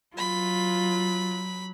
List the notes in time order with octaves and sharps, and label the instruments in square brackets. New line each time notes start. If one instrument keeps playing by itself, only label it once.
[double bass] F#3 [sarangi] F4 [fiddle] B5